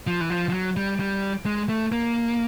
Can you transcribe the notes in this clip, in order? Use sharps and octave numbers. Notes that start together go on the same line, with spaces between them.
F3
E3
F3
F3
F#3
G3
G3
G#3
A3
A#3